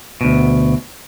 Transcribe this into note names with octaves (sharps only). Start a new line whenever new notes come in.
D2 B2